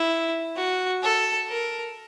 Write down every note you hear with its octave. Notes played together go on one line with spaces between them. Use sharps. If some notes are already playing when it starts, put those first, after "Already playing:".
Already playing: E4
F#4
A4
A#4